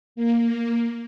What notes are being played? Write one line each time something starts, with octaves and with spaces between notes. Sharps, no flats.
A#3